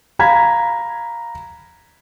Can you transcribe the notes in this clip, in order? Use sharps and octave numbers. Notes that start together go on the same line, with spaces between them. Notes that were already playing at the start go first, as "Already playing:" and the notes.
F5 A#5 B5 G#6 B6